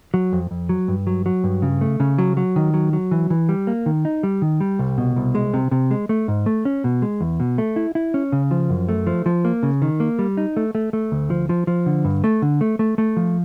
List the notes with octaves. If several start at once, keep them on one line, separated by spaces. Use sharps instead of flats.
F#3
F2
F2
F#3
G2
F#3
F#3
G2
C#3
A3
C#3
F#3
F#3
D#3
F#3
F#3
E3
E3
G3
A#3
D#3
D#4
G3
D#3
G3
C2
B2
C2
G#3
C3
C3
G#3
A3
G#2
A3
C#4
B2
G#3
E2
B2
A3
E4
E4
C#4
C#3
F3
F#2
A3
F3
F3
A#3
C#3
D#3
A#3
G3
D#4
A3
A3
A3
D2
F3
F3
F3
D3
G2
A3
D3
A3
A3
A3
F3